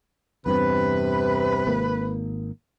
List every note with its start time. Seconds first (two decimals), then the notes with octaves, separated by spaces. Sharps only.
0.46 E2 G2 C3 C4 B4
1.67 G#1 A#3